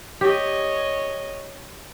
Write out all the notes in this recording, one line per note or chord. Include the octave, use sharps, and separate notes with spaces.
G4 C#5 D#5